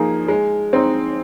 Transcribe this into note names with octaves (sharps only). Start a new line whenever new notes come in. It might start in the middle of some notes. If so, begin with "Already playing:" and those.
Already playing: F3 A#3 D#4 G#4
G#3
C4 D#4